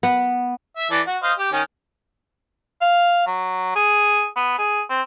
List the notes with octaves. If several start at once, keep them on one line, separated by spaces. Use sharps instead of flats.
B3
E5
E3 A4 D5
F#4
C5 D#5 F5
G4
D#3 C#4
F5
F#3
G#4
B3
G#4
C4